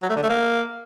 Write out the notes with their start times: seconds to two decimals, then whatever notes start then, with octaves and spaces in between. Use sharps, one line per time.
0.03 F#3
0.09 A3
0.16 D3
0.23 A3
0.29 A#3